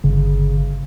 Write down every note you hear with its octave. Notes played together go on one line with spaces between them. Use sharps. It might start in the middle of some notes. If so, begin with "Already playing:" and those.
G1 C#3